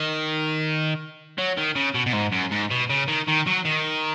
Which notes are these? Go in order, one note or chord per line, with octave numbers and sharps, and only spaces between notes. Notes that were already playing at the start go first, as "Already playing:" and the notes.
Already playing: D#3
F#3
D#3
C#3
B2
B2
G#2
F#2
G#2
B2
C#3
D#3
D#3
F#3
D#3